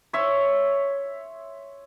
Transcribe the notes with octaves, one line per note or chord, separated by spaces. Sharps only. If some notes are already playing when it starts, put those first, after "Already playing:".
C#5 E5 C6